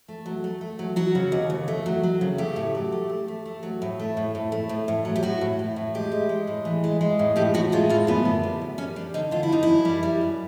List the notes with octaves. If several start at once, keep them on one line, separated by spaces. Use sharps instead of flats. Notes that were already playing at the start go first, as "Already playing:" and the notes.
A3
F#3
A3
A3
F#3
F#3 F#4
C#3
D#2
D#2
A3
F#3
F#3
C#3
A3 G4
A2
F#3
A3
A3
A3
A3
F#3
A2
A3
A2
A2
A3
A2
A2
F#3
G4
A2 F#4
A2
A2
A2
G#3 G4
G#3
G#3
A2
E3
G#3
G#3
A2
A2 G4
A2 F#4
G#3 F4
A2 F4
F#2 B3
D3
G3
F#2
G3 C#4
G3 D4
D3 D#4
D3 F4
E4
G3 D#4
F#2 E4
G3
G3
F#2